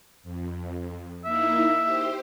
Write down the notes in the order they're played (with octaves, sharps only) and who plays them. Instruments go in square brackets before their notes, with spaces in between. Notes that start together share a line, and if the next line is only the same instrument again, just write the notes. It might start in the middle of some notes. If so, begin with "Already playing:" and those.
[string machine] F2
[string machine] A#3 D#4 E4 [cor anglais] E5
[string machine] G4 C5